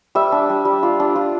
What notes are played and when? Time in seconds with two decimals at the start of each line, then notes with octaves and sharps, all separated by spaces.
0.15 G3 E5
0.32 D4
0.49 G3
0.65 G3
0.83 F4
1.00 D4
1.16 F4